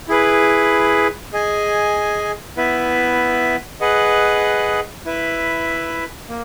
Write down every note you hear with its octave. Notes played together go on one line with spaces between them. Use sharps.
E4 G#4 B4
G#4 D#5 G#5
B3 E4 B4 E5
G#4 B4 D#5 F#5
E4 B4 E5
A#3